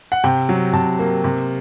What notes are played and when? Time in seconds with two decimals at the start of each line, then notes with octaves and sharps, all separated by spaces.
0.12 F#5
0.24 C3 G5
0.49 F#3
0.73 C3 A5
0.99 A#3
1.24 C3